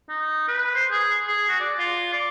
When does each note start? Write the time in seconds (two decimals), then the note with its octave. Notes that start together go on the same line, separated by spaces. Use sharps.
0.09 D#4
0.48 B4
0.75 C5
0.91 G#4
1.27 G#4
1.49 F#4
1.60 D5
1.78 F4
2.13 D5